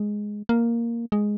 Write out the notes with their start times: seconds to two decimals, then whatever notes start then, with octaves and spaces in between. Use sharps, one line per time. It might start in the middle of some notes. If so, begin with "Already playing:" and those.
Already playing: G#3
0.49 A#3
1.12 G#3